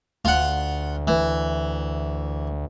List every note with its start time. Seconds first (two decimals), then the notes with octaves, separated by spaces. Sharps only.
0.25 D2 F4 F#5
1.07 E3